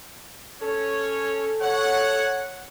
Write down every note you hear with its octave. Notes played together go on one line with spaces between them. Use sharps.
C#4 A4 C#5
C#5 F#5